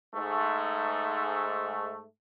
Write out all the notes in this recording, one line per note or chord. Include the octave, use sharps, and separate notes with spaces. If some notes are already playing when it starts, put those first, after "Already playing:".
G#2 A3